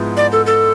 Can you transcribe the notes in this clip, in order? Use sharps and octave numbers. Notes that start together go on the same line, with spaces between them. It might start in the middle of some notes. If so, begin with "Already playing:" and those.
Already playing: G#2 F3 G#3 B3 E4
D5
A4
A4